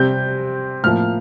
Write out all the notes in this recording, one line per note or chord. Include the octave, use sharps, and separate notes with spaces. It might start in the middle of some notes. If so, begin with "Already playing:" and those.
Already playing: C3 G3 C4 G6
A2 F3 A#3 F6